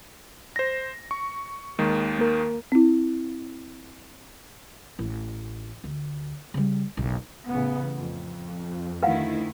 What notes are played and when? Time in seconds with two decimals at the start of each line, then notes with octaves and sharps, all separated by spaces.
0.56 C5 A#6
1.11 C#6
1.79 D#2 D#3 G#3
2.18 A#3 A#4
2.72 C4 E4
4.99 A1
5.84 D2
6.54 C#3 G3
6.97 F#1 B1
7.48 A1 C#3 B3
7.96 F2
9.03 D2 D#3 E4 B4 F5 F#5